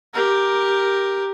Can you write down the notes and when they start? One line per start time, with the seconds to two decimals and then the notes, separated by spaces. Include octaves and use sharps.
0.14 G4 A#4